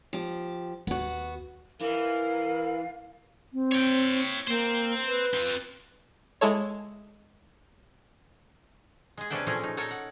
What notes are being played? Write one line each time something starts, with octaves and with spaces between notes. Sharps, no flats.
F3 G4
D#2 B3 F#4
E3 A#4 F5
C4
C#5 G5
A#3 C5 G5
B4
C4 F4
G#3 E4 A4 C#5
G#3 G#4
C3 C#4 D4 B4 E5 G5
A#2 F3 A3 C#4 G#4 A#4
D#4
D#4 A4 A#4 C#5 D#5
F#5